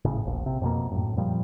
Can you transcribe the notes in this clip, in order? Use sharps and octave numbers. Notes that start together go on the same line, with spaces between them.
G#1 A2 C#3
E1 A#1
C3
F2 B2 A#3
F#2 A2
F2 A#2 F3 G3